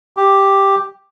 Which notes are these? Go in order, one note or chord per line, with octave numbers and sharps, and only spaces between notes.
G4